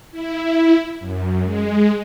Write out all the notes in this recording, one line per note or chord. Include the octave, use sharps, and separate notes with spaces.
E4
F#2
G#3